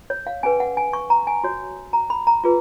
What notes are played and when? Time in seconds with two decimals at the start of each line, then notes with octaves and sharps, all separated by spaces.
0.10 C#5
0.27 F5
0.43 C#4 G#4 B4 G#5
0.60 F#5
0.77 G#5
0.93 C#6
1.10 A#5
1.27 G#5
1.44 F#4 C#5
1.93 A#5
2.10 B5
2.27 A#5
2.44 F4 G#4 B4